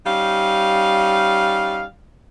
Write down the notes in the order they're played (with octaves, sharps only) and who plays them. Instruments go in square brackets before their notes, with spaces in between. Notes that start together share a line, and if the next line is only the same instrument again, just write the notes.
[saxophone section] G3 C#4 D#4 F5